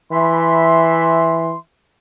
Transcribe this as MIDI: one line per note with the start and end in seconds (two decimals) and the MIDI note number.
0.12 1.54 52
0.12 1.58 76
0.12 1.58 83
0.12 1.58 84